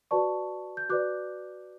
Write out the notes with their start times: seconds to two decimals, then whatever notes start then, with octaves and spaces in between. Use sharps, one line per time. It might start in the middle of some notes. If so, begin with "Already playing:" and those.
0.11 F#4 B4 D5 A5 C#6
0.77 G6
0.90 F#4 B4 D5 D6 F#6